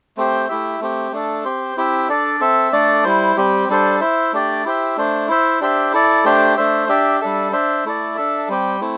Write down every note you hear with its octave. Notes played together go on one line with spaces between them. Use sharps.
A3 C4 G4 C5
A3 E4 G4 E5
A3 C4 G4
A3 D4 A4
C4 G4 C5
C4 E4 G4 E5
D4 A4 D5
C4 A4 E5
A3 D4 A4 D5
G3 E4 C5
G3 C4 G4
G3 D4 A4 C5
E4 C5 E5
A3 D4 G4 D5
E4 G4 C5 E5
A3 D4 C5
E4 C5 E5
D4 G4 C5 E5
E4 A4 D5
A3 D4 G4 C5
A3 D4 C5 E5
D4 G4 E5
G3 D4 A4 E5
D4 C5 E5
A3 E4 A4 D5
D4 A4 E5
G3 C4 G4
A3 C4 E4